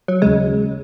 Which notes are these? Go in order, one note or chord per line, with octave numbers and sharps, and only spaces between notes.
F#3
D#2 C#3 G#3